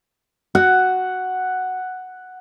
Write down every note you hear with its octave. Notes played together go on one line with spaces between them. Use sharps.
F#4 F#5